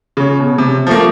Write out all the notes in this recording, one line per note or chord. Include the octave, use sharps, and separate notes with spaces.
C#3 C#5
B2
C3
F3 A3 A#3